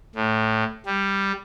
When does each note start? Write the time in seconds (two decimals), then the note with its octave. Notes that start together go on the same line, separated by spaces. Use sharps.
0.15 A2
0.86 G3